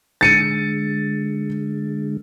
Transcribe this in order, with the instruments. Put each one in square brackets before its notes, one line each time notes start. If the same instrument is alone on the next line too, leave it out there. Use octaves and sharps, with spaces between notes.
[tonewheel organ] D3 G#3 [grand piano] A6 C#7 D#7